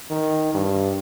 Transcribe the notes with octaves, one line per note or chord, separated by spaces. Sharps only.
D#3
G2